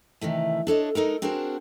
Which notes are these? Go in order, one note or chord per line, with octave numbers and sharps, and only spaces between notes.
C3 D#3 E3 A3
D4 A4 C#5 D#5
G#3 D#4 A4 A#4
C4 D4 F#4 G#4 A#4 C5